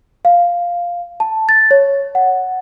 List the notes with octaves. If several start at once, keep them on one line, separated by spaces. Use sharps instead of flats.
F5
A5
A6
C#5
F#5